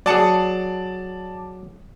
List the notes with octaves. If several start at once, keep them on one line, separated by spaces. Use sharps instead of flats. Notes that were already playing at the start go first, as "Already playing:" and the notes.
F#3 G#4 D5 A5 C#7